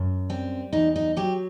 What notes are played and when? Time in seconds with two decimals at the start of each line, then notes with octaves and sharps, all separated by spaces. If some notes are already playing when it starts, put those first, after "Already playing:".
Already playing: F#2
0.30 G3 C4
0.73 E2 D#4
0.96 D#4
1.16 F#3 G4